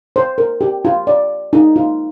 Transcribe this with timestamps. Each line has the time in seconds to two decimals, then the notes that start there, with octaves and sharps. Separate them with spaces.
0.16 C5
0.38 A#4
0.61 G4
0.85 F4
1.07 D5
1.53 D#4
1.76 F4